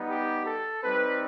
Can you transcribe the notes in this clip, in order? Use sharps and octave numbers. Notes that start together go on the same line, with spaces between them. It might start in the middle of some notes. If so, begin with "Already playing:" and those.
Already playing: G3 B3 D#4
G4
A4
G3 C4 D#4 B4